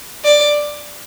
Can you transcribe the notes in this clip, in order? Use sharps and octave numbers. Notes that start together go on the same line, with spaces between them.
D5